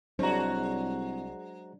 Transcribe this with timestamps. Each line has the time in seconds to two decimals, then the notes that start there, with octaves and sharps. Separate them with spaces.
0.19 C2 F#3 G#3 D4 F#4 C5 C#5 A#5